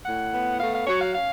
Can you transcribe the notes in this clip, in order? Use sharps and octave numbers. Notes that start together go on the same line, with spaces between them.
A2 F#5
B3
A3 F5
F5
F#3 C#5
F5
C#4 F5